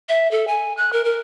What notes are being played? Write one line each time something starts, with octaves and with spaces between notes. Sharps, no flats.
E5
A4
G#5
F#6
A#4
A#4